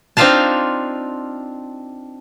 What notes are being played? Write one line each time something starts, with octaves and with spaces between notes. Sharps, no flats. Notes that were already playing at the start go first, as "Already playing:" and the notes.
C4 D4 D#4 F4 F5 A5